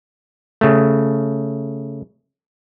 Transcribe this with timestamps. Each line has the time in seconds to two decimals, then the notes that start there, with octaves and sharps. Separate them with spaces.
0.61 C#3 A3